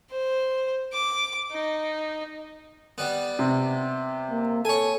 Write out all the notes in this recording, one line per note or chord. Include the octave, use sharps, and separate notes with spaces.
C5
D6
D#4
G3 B3
C3
A#3
A4 C#5 G#5